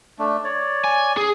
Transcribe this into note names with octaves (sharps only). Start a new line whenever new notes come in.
A3 D4
C#5 D5
G#5
G#4